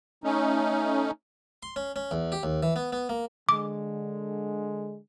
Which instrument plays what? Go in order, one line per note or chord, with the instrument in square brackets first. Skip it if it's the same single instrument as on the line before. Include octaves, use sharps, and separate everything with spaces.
[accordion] A3 C#4 D#4
[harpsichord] C6
C#4
C#4
E2
G4
D#2
E3
B3
B3
A#3
[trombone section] D3 G#3 [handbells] D6